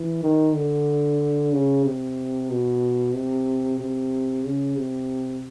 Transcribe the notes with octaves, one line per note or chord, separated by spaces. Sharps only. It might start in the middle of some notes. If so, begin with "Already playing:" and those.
Already playing: E3
D#3
D3
C#3
C3
B2
C3
C3
C#3
C3